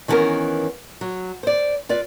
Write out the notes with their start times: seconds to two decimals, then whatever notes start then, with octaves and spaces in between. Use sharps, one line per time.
0.08 D#3 E3 G3 B3 C#4 A#4
1.01 F#3
1.43 C5 D5
1.89 F4 B4 D5